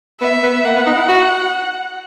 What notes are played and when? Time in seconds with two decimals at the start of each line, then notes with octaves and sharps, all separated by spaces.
0.21 B3 E5
0.43 B3
0.65 A#3 F#5
0.75 B3
0.86 D#4
0.97 E4
1.08 F#4